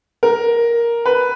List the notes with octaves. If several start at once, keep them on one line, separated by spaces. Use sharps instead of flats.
A#4
B4